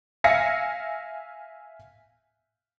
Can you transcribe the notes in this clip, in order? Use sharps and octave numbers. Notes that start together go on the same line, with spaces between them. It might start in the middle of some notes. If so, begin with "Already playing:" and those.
E5 F5 G#5 A#6 C#7